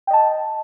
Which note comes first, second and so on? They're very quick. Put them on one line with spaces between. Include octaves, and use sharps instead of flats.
G5 D#5 A5